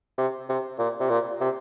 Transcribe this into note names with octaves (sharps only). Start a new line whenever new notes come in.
C3
C3
A#2
C3
A#2
C3